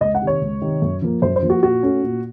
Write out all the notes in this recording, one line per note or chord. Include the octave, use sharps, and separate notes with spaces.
C#2 D#5
F#5
C3 D#3
C#5
C#2
C3 D#3
F#2
F3 A#3
F#2 C5
C5
F3 A#3
F#4
A#2 F#4
A3 C#4
A#2